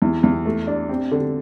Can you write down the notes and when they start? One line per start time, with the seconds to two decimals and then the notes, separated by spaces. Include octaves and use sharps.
0.02 E2
0.23 E2
0.45 A3
0.67 D4
0.89 C4
1.11 D3